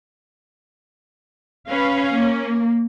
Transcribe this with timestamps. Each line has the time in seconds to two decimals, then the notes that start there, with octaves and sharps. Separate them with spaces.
1.69 C#4 B4 F5
2.13 A#3